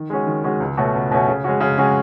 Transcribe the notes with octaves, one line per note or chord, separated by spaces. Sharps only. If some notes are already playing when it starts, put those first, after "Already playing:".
Already playing: D#3
G#3 C#4 F#4
D#3
G#3 C#4 F#4
C#2
B2 A3 C#4 F#4
C#2
B2 A3 C#4 F#4
C#3
G#3 C#4 F#4
C#3
G#3 C#4 F#4